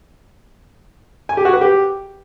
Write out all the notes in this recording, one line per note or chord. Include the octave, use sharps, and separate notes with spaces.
G#5
G4
F#4
B4
G4